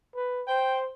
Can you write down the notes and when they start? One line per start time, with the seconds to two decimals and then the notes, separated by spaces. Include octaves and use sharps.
0.16 B4
0.48 C5 G5